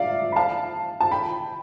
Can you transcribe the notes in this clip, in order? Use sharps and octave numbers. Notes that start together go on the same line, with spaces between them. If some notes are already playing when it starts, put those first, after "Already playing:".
Already playing: D5 E5 F5
B5
F5 A5
A5
G5 B5